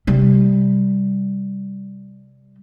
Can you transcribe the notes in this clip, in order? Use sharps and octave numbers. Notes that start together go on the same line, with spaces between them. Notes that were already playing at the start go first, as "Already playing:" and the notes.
C3 G3